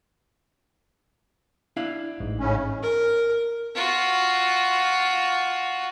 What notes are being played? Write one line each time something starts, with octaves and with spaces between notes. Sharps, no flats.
D4 E4 F5
A1 G#2
A2 C#3 C#4
A#4
F4 F#4